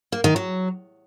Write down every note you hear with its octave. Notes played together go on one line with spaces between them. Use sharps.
A#3
D#3
F#3